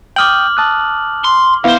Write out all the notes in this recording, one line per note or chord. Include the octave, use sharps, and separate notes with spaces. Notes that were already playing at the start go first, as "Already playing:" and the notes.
G5 D6 D#6 F6 G6 F#7
A5 D#6 F#6
C6
D#2 B3 E4 C5 F5